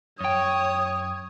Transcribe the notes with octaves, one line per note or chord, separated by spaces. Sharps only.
F#2 C#5 G5 D#6